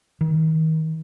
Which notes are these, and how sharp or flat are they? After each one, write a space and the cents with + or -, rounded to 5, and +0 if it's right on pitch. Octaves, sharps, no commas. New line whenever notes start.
D#3 +35